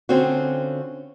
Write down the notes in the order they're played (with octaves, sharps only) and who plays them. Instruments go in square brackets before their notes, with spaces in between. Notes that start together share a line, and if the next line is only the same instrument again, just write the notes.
[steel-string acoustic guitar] D3 C4 C#4 F4 F#4